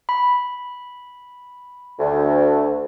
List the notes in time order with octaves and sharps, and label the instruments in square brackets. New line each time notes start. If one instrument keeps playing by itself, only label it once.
[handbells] B5
[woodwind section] D2